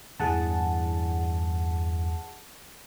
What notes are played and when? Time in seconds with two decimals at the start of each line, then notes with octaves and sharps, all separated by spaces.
0.20 E2 G2 E3 G#4 F#5 A5